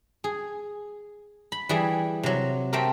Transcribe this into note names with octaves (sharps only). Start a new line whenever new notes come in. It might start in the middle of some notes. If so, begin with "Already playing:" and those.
G#4
B5
E3 G3 G#4
C3 F#3
A3 C4 G4 A#4